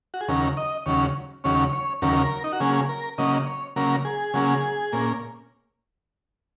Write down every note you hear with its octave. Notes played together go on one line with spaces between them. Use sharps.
F#4
G#4
D#2 C#3 F#3 C#4 A#4
D#5
D#2 C#3 F#3 C#4 C#5
D#2 C#3 F#3 C#4 C#5
C#5
D#2 C#3 F#3 C#4 A#4
D#4
F#4
C#3 F#3 A#3 C#4 G#4
A#4
C#3 F#3 A#3 C#4 D#5
C#5
C#3 F#3 A#3 C#4 A#4
G#4
C#3 F#3 A#3 C#4
A#2 A#3 C#4